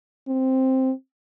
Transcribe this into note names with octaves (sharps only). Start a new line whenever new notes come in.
C4